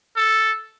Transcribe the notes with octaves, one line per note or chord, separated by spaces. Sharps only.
A4